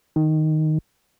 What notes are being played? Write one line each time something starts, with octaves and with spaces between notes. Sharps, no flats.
D#3